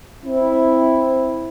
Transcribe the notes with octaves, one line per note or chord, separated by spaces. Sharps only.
C4 E4